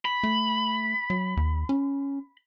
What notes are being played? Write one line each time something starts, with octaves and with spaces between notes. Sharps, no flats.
B5
A3
F#3
D#2
C#4